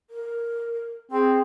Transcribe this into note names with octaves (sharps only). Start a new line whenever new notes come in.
A#4
C4 G#4